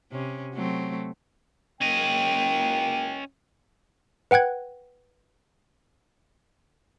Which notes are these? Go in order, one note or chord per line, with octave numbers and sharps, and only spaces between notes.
C3 C#4
F#3 A3 C4
F#1 A#3 C#4 D#5 G5
B4 F#5 G5 F#6 G#6